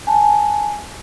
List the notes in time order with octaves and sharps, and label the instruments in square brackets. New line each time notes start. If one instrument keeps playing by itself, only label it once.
[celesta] G#5 A5